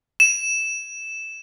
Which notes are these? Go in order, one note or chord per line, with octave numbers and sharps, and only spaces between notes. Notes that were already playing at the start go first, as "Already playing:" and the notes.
E7